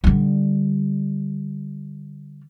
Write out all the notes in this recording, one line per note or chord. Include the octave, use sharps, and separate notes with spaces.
D3 G3